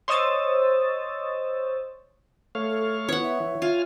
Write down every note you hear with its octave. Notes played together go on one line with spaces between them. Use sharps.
C5 C#5 D#5 D#6 E6 A6
A3 C#5 F5
A4
B3 E4 C#5 F#5
E5
E3
F4 G#5 F6